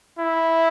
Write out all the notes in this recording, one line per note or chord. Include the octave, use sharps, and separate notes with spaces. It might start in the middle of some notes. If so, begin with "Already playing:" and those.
E4